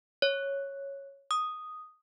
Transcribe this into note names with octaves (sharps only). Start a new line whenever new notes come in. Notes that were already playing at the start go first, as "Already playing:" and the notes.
C#5
D#6